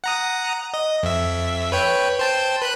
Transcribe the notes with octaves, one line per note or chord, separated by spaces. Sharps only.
F#5 A#5 D#6
D#5
F2 E5
B4 C#5 G5
C5 G5 A5
B4 B5 F#6